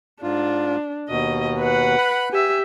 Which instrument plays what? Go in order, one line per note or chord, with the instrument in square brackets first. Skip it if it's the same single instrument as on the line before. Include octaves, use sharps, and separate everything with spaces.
[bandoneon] G#2 F4 [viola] D4
[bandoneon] D#2 B2 [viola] D#5
[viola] B4 F#5
[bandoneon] B5 F#6
[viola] G4 E5 [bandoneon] G#5